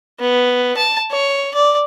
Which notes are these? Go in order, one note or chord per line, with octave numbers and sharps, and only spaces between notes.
B3
A5
C#5
D5